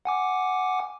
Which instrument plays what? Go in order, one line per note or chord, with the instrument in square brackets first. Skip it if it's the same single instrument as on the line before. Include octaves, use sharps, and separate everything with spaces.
[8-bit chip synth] F#5 G#5 D6